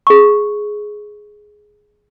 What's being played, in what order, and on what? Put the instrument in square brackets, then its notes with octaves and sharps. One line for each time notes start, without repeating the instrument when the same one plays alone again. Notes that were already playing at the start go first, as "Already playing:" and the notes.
[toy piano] G#4 C#6